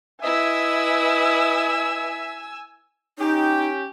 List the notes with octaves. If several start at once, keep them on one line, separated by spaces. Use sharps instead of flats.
E4 B4 D#5 E5 G#5 E6
C#4 D#4 G4